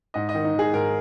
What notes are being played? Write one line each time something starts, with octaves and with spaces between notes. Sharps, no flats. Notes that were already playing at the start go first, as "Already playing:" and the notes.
G#2 D#5
D#5
D#3
D#4
D#3 G#4
G#2 A#4